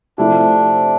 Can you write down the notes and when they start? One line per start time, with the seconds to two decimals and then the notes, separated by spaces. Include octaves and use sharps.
0.18 C3 F3 A3 D4 E4 G4